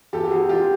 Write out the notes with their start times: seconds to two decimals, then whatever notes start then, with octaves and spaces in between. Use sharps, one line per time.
0.13 E2 G4 A4
0.24 G4
0.31 E2 F#4 G#4
0.49 G#3 F4 G4